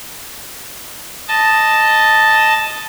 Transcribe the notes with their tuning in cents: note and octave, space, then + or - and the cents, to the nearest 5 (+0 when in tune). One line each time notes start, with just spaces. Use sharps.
D#5 +0 A5 +0